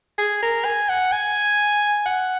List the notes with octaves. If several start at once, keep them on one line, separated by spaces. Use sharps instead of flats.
G#4
A#4
G#5
F#5
G#5
F#5